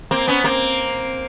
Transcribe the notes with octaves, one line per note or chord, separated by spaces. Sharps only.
A#3 C4
B3 C#4
A#3 C4